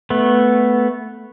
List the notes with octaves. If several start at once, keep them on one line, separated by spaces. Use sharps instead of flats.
A3 B3